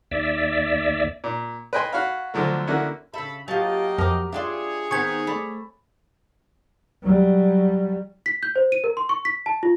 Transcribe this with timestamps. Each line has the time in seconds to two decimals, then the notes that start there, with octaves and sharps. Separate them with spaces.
0.11 D#2 D5 E5
1.24 A#2
1.73 B4 D#5 G5 G#5 C6
1.92 F#4 C#5 F5 B5
2.34 D2 D3 F3 F#3 A3
2.67 D3 A#3 C#4 E4 F#4
3.14 C#3 A4 E5 B5
3.48 F#3 A#3 F4 G4 D#5 G5 A5
3.98 F2 A#4 D6
4.32 D4 F4 G#4 C#5 D5 E5 G5 C6
4.91 D#3 B3 C4 G#5 C#6
5.27 A3 D5 B5
7.02 F#3 G3
8.26 B6
8.43 G6
8.56 C5
8.72 D#7
8.84 A#4
8.97 C6
9.09 C#6
9.25 B6
9.46 A5
9.63 F4